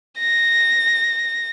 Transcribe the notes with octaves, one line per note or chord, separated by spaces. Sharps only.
A#6